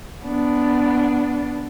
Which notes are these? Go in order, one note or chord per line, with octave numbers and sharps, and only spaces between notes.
B3 D4